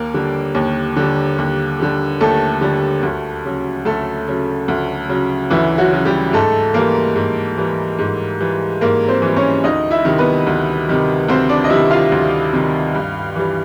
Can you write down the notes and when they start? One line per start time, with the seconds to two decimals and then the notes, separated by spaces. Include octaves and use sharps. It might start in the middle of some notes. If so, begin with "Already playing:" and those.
Already playing: D#2 A#3 A#4
0.14 D3 G3
0.55 D#2
0.96 D3 G3
1.38 D#2
1.79 D3 G3
2.21 D#2 A3 A4
2.61 D3 G3
3.03 D2
3.45 C#3 F#3
3.85 D2 A3 A4
4.27 C#3 F#3
4.68 D2
5.09 C#3 F#3
5.50 D2 E3 E4
5.78 F#3 F#4
5.91 C#3 F#3
6.05 G3 G4
6.33 G#2 A3 A4
6.74 E3 G3 A#3 A#4
7.16 G#2
7.57 E3 G3
7.99 G#2
8.40 E3 G3
8.81 G#2 A#3 A#4
9.08 C4 C5
9.22 E3 G3
9.36 C#4 C#5
9.64 D2 D#4 D#5
9.91 E4 E5
10.04 C3 D#3 G3
10.18 B3 B4
10.47 D2
10.88 C3 D#3 G3
11.28 D2 C4 C5
11.49 D4 D5
11.64 D#5
11.70 C3 D#3 G3 E4 E5
11.91 F4 F5
12.12 D2
12.53 C3 D#3 G3
12.95 G2
13.36 E3 G3